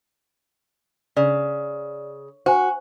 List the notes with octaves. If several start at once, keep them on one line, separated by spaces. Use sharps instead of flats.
C#3 D5
F#4 C5 G#5